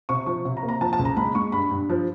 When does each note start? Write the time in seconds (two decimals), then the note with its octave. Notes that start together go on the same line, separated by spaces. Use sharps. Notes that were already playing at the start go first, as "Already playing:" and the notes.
0.09 C3 C#6
0.26 F3 C#6
0.45 C3
0.57 A#5
0.63 A#3
0.69 A#5
0.81 F3 A5
0.93 A5
0.99 C#2
1.05 A#5
1.17 G#3 B5
1.35 G#3 C#6
1.52 G2 B5
1.71 G2
1.90 F3